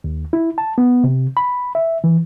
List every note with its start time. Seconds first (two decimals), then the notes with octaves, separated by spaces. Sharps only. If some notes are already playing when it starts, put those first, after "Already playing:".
0.04 D#2
0.33 E4
0.58 A5
0.78 B3
1.04 C3
1.37 B5
1.75 E5
2.04 E3